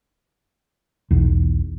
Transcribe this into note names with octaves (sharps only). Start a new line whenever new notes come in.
B1 E2